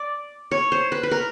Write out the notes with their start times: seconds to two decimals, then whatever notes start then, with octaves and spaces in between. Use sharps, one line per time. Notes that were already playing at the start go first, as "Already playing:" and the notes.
Already playing: D5
0.51 C#5
0.72 C5
0.92 B4
1.03 B4
1.11 A#4